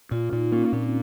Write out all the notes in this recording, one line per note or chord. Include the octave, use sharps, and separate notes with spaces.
A#2 F4
A#2 D#4
A#3 C#4
A#2 C4
C#4